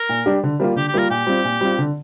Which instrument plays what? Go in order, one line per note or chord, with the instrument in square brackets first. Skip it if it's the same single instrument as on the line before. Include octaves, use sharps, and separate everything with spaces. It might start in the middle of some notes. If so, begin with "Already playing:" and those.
Already playing: [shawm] A#4
[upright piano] A#2
G3 D4 G4
D3
G3 A#3 F4
[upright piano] D3 [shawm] G4
[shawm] G4
[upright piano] G3 A#3 F4 [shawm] A#4
[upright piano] A#2 [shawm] G4
[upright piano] G3 C4 F4
A#2
G3 C4 F4
D3